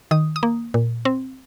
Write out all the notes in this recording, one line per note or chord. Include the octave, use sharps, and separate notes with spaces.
D#3 D#6
D#6
A#3
A#2
C4